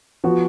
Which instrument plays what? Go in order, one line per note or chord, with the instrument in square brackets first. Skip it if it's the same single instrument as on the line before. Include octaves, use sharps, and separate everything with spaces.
[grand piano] F3 B3 F#4